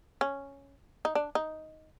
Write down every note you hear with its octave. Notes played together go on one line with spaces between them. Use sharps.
C#4
D#4
D4
D#4